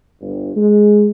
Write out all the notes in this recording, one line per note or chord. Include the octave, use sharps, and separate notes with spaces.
G1
G#3